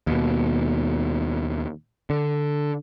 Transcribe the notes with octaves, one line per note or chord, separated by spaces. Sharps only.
D#2 B2
D3